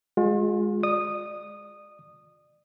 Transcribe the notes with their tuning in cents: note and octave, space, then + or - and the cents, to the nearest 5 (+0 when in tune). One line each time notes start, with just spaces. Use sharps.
G#3 +0 F4 +40
D5 +35 D#6 -15